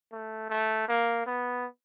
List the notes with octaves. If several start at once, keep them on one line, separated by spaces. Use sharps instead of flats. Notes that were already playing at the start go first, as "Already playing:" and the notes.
A3
A3
A#3
B3